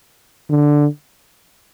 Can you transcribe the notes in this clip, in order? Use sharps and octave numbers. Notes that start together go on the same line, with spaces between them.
D3